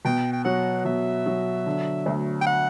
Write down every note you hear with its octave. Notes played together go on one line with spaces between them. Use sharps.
B2 G5
G5
F#3 F#5
B2 E5
F#3
D3
D2
G5
F#5